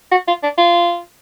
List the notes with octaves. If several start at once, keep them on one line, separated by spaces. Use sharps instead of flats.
F#4
F4
D4
F4